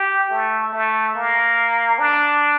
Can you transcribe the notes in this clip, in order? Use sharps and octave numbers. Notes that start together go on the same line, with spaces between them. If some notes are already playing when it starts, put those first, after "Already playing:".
Already playing: G4
A3
A3
A#3
D4